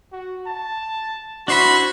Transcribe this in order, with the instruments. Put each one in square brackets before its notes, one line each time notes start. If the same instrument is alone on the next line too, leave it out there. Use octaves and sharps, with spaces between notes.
[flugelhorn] F#4
A5
[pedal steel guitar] D4 C5 B5 [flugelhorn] E4 [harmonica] F#4